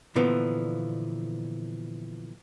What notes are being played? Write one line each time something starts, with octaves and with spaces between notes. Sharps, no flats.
A#2 D3 E3 F3 B3